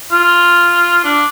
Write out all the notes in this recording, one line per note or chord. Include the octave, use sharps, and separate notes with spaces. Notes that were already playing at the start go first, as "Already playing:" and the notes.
F4
D4